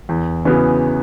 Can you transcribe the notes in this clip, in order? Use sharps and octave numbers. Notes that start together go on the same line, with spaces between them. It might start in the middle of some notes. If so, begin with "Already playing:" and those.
E2
C#3 E3 B3 F#4